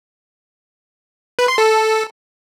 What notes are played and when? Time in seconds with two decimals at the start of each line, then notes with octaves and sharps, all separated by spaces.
1.39 B4
1.48 C6
1.58 A4